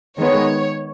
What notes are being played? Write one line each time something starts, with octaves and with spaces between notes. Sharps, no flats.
D#3 G#3 B3 C#5